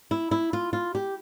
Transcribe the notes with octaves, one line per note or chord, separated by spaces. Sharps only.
E4
E4
F4
F4
G4